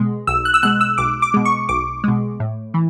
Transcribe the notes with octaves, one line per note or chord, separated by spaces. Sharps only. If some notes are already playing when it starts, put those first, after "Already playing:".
Already playing: B2 G#3
B1 E6
F#6
E6
B2 G#3 F#6
E6
B1 D6
D6
B2 G#3
C#6
B1 D6
B2 G#3
A2
E3